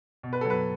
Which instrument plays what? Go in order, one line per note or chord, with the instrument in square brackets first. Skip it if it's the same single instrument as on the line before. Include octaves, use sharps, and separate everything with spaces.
[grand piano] B2
B4
F#3 A4
B4